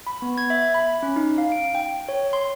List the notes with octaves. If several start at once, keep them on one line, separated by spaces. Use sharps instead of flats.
B5
B3
G#6
E5
B5
C#4
D#4
F5
D7
G5
C#5
C6